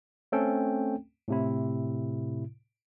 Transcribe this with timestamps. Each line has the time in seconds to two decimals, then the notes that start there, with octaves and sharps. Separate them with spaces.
0.32 A3 C4 C#4 A4 G5
1.28 A2 C3 E4